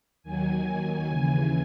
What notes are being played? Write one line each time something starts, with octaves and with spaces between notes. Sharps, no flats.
D#2 D#3 F#3 G#5
D#2 C#3 E3